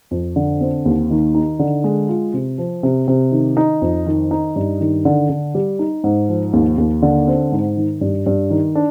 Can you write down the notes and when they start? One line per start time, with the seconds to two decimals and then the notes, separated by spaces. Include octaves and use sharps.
0.11 F2
0.36 D3
0.61 C4
0.85 D#2
1.10 D#3
1.35 D#4
1.59 D3
1.84 G#3
2.09 F4
2.34 C3
2.58 F3
2.83 C3
3.08 C3
3.32 D#3
3.57 D#4
3.82 F2
4.06 D#3
4.31 D#4
4.56 G2
4.81 D#3
5.05 D3
5.30 D3
5.55 G3
5.79 D#4
6.04 G#2
6.29 F3
6.53 D#2
6.78 D#2
7.02 D3
7.27 C4
7.52 G#2
7.77 D#3
8.01 G2
8.26 G2
8.50 D#3
8.75 D4